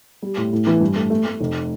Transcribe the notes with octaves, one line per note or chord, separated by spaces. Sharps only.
G3
A2
A2
E3
G2
A3
A3
A3
F1